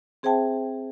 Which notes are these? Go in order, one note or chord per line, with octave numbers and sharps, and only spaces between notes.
C4 G#4 C5 E5 G5 A5